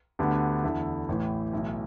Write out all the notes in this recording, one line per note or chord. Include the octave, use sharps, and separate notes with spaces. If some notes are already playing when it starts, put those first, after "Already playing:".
D2 D3 B3 D4 G4
E2 D3 A3 E4
A1 A2 E3
B1 A2 E3